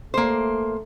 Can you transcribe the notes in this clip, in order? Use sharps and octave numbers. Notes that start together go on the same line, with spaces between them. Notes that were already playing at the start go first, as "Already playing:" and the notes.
A3 A#3 C5